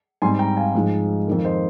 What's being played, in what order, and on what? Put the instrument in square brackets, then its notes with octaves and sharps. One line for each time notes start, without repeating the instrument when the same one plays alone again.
[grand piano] G#2 G3 C4 G#5 C6
G5 A#5
F5 G#5
G#2 F3 G#3
F2 D#3 A#3
C5 D#5